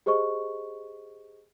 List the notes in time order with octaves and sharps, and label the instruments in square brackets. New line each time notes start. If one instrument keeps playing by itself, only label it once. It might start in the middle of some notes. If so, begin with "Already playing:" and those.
[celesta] G4 G#4 C5 D#5 C#6